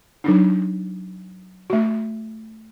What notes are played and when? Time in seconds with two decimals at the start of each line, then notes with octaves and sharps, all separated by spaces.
0.24 F#3 D4 D#4
1.70 A3 F#4